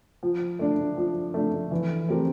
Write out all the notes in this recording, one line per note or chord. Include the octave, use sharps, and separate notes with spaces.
F3
A3 D4
F3
A3 D4
E3
A3 C4 G4 A#4